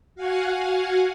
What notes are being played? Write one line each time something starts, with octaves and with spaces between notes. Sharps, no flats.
F#4 F5 F#5 G#5